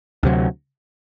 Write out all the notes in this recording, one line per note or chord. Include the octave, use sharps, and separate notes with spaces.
D2 C3 F#3